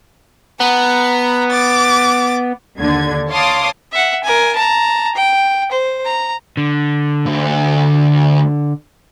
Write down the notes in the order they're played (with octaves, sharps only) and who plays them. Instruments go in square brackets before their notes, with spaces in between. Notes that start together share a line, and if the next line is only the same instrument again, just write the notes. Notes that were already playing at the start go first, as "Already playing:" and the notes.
[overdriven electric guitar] B3 [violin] A#5
[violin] D6 A6
[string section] D#2 D3 G#6
C#5 F5 A5 C6 D6 D#6
[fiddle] E5 F#5
A#4 G#5
A5 A#5
G5
C5
A#5
[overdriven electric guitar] D3
[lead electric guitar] D2